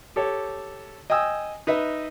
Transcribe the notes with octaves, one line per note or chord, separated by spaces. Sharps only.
G4 A4 C#5
D#5 G5 G#5 D#6 E6
D#4 B4 D#5 E5